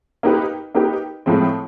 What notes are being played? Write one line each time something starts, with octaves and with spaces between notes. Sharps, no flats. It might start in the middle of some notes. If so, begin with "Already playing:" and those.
A#3 D#4 G4 B4
A#3 D#4 G4 B4
A2 F3 G#3 C4